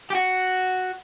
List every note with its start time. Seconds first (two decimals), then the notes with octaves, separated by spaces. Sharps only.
0.10 G4
0.15 F#4